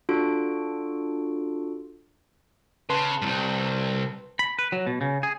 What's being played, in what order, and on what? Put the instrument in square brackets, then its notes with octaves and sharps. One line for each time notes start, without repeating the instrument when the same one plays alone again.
[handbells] D4 F4 F#4 A4 D7
[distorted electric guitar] C#3 [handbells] B4 A5 C6
[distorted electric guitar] C2 G2
[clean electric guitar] B5
B4
F#3
B2
C#3
G#4